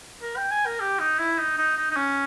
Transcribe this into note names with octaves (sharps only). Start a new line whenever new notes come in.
A#4
G5
G#5
A#4
G4
D#4
E4
D#4
D#4
D#4
D#4
C#4